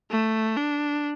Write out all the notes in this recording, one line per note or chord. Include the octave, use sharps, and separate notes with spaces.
A3
D4